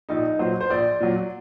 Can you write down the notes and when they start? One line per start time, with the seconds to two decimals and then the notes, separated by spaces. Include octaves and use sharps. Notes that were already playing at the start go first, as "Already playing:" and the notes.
0.09 A#1 D#4
0.39 A#2 F#3 C5
0.61 C5
0.70 A#1 D5
1.00 A#2 F#3